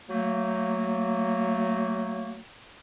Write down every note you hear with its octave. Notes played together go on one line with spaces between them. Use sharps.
F#3 A3 A#3